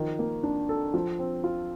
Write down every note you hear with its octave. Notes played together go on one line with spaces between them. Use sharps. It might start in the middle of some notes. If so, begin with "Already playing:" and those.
Already playing: D#3 F3
A#3
D4
A4
F3
C4
F4